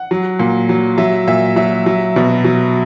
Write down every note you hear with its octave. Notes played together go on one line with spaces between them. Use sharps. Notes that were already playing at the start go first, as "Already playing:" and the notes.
Already playing: F#5
F#3
A#2
F#3
F#3 E5
A#2 E5
F#3 E5
F#3
B2
F#3